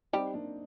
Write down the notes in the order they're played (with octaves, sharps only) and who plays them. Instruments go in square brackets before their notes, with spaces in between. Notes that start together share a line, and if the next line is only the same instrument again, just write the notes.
[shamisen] G3 G4 [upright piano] C4 D#4
[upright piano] A#3 D4